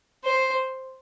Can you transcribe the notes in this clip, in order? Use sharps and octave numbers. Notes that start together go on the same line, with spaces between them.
C5